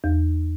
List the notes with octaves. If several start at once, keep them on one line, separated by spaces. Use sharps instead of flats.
E2